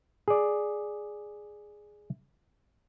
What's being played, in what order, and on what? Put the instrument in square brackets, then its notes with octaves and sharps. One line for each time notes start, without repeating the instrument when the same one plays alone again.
[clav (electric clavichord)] G#4 D5